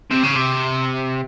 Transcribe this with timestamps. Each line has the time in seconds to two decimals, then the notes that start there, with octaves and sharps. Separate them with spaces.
0.11 C3
0.24 C#3
0.35 C3